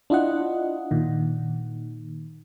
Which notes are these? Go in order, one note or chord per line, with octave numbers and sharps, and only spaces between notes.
D4 E4 F4 D#5 F#5
A#2 D#3